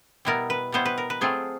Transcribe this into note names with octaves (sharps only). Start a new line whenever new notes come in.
B2 G3 B3 E4 A#4
B4
B2 G3 B3 E4 C5
B4
A#4
B4
F#3 A3 C4 F4 G#4